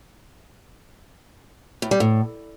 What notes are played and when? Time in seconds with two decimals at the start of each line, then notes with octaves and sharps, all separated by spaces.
1.82 A2
1.91 G3
2.00 A2